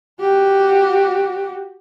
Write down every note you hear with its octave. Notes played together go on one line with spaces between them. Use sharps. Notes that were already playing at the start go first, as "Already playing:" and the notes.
F#4 G4